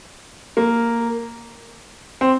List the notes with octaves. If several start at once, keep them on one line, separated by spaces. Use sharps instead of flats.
A#3
C4